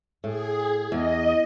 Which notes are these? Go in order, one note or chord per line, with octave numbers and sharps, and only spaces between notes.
A2 G#4
E2 D#5